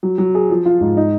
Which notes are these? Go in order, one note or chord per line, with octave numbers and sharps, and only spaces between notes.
F#3
F#3
G#4
F3
F4
G#2
D#4